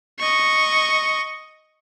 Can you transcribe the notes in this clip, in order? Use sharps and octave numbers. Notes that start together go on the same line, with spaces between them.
D#5 C#6